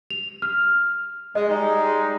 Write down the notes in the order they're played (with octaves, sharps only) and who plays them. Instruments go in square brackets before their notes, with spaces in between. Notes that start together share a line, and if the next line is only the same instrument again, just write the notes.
[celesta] F7
F6
[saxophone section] G#3 [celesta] D#5
[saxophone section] G3 G#3 D#4